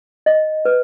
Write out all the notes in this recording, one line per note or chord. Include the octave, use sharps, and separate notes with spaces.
D#5
B4